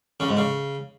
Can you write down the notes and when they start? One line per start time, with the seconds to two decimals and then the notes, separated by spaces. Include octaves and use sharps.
0.20 C#3
0.29 G#2
0.37 C#3